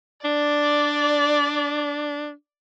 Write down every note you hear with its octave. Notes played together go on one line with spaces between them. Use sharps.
D4 D5